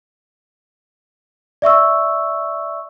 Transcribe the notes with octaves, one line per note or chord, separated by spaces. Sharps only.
D5 E5 C#6 E6